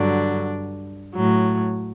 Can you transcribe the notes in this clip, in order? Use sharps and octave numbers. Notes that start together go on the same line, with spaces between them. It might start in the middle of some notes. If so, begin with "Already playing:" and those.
Already playing: G2 D3 F#3 D4
A2 F#3